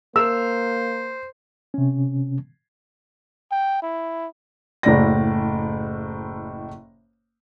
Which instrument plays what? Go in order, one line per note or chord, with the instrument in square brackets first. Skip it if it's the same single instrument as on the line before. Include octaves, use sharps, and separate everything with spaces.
[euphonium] A#3 [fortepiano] A#4 [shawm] C5 [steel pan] E6
[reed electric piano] C3 C#4
[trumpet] G5
E4
[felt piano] F#1 A2 D5 A#6